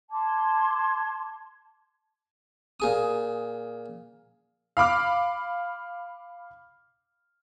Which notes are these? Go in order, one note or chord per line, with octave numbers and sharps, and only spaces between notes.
A5 C6 D6 G#6
A#2 G#4 D#6
F5 B5 D6 F6